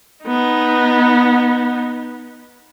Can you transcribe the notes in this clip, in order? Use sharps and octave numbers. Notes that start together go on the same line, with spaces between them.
B3 D#4